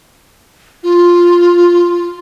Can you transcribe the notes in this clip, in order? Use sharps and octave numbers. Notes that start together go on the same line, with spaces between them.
F4